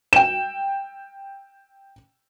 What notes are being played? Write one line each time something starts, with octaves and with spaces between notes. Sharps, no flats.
G5 E7